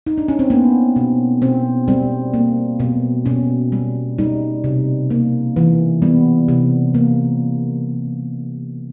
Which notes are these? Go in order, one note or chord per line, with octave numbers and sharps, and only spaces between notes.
D#4
D4
C#4
C4
A#3 B3
B2
B2 C4
G3 C4
A#3
B2
B2 C#4
G3
G3 D#4
C3
A#3
E3
G3 B3
C3
A#3